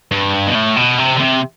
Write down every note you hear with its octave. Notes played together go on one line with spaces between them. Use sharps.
G2
B2
A2
B2
C3
D3
C3